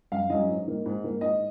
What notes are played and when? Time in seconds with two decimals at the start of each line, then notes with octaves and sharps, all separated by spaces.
0.12 F#2 F5
0.30 D#3 F#3 C#4 D#5
0.49 G#2
0.67 D#3 A#3
0.86 G#2
1.04 D#3 A#3
1.21 G#2 D#5